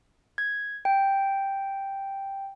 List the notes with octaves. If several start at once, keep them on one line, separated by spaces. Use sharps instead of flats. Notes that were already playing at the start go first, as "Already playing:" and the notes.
G#6
G5